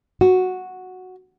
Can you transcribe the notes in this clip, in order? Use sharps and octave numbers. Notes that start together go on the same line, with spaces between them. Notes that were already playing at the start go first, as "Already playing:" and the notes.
F#4